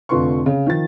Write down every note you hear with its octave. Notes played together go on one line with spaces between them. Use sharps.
F1 D3 F4 B4 C6 C#6
C#3
D#3 F3 A6